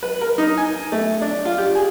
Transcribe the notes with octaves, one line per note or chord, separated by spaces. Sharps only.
B4
A#4
D#4
G#5
A3
D4
F4
G4
G#4